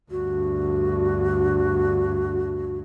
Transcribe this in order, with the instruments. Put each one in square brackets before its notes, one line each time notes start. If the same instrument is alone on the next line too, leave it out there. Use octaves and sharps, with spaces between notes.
[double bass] D2 G2 [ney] F#4